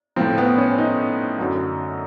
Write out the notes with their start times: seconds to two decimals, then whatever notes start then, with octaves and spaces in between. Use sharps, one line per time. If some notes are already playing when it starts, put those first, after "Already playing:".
0.16 A2 F3 C4
0.38 B3
0.58 C#4
0.78 D#4
1.38 F#2 D3 F#3